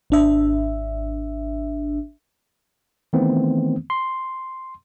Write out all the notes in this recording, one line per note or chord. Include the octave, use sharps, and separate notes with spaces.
G#1 D4 E5
D#3 E3 A3 B3 C4
C6